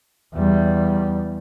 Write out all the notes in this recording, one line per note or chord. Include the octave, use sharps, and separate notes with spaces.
E2 G3